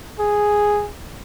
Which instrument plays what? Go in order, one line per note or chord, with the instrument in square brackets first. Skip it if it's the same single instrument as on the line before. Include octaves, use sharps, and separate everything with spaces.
[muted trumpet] G#4